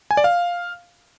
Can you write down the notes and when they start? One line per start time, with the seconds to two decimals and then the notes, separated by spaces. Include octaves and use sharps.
0.11 G#5
0.17 D5
0.24 F5